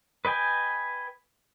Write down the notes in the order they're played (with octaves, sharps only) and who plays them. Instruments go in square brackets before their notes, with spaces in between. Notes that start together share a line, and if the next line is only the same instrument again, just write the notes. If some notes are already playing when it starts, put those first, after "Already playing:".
[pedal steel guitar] B4 D#5 G5 G#5